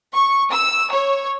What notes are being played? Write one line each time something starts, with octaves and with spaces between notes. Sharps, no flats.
C#6
E6
C#5